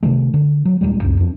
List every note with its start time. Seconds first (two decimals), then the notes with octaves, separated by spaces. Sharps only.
0.03 C3 D#3 F3 A3
0.34 D3
0.65 F#3
0.81 D#1 B1 G3 G#3
1.02 C#2 F#2
1.20 F2 D4